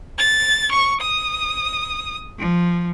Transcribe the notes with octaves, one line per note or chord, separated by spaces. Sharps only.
A6
C#6
D#6
F3